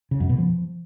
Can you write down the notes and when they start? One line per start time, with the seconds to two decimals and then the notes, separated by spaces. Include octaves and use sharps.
0.11 C#3
0.20 F#2
0.29 B2
0.38 F3